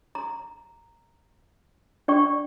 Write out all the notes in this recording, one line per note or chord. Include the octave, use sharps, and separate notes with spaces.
A#5
D4 D5 G5 C#6